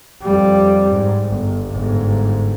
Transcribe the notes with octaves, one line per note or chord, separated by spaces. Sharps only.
F2 G3
G#2
G1
G1 G#2